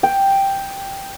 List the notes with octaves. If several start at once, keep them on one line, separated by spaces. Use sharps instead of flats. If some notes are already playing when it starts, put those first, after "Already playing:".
G5